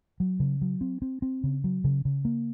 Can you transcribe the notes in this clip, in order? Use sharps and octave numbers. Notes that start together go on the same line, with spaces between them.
F#3
C#3
F#3
C4
C4
C4
C#3
F#3
C#3
C#3
A#3